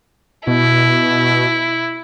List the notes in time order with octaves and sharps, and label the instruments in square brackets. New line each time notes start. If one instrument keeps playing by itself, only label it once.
[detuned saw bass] B2 [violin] E4